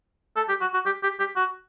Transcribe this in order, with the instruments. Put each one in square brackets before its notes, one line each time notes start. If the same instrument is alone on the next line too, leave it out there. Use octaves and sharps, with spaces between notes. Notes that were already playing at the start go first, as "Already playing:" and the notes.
[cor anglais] A4
G4
F#4
F#4
G4
G4
G4
F#4